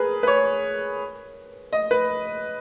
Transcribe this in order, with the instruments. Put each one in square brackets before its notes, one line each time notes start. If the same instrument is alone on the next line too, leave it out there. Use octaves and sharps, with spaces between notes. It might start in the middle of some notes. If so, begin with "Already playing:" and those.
Already playing: [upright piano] G#4 A#4 B4
B4
C#5
D#5
B4